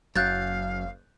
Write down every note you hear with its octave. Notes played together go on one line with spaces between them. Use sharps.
F#1 F#2 F5 F#6 G6 A6